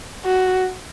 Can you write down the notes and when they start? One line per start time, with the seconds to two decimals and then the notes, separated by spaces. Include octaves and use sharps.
0.25 F#4